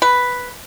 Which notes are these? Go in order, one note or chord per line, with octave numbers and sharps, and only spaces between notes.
B4